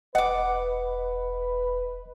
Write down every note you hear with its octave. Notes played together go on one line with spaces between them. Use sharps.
E1 B4 D#5 F#5 D6